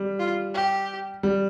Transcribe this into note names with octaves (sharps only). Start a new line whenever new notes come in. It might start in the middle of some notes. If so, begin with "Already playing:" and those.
Already playing: G3
F4
G4
G3